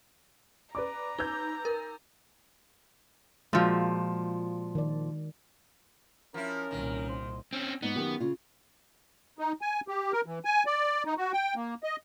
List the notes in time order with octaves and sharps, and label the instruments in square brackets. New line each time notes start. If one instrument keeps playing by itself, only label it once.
[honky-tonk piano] B4 D5 D6 [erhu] A#5
[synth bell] D#4 [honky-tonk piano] B4 E6 G6
[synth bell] A#4
[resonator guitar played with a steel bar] A#2 F3 [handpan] G#3 F#4
[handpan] D#3 D5
[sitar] F3 E4 [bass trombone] C#4 [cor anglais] A#4
[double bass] C2 A#2 [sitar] D#3
[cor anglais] C5
[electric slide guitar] C4 C#4
[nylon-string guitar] G#2 D#4 [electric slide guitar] B3
[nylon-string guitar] F#2 D#3 G4
C#3 F4
[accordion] D#4
G#5
G4
A#4
E3
G#5
D5
D#4
F#4
G5
A#3
D#5